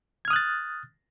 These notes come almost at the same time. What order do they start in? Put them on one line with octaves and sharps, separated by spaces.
G#6 F6 D#6 F#6 A6